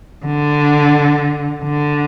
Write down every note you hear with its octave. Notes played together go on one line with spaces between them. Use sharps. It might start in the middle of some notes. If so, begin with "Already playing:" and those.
D3
D3